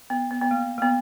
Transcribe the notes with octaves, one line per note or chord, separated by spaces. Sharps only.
B3
B3
B3
A#3
A#3
B3